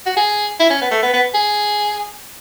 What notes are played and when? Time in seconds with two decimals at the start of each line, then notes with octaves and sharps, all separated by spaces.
0.06 F#4
0.17 G#4
0.60 E4
0.70 C#4
0.82 B3
0.91 A3
1.03 B3
1.14 B3
1.35 G#4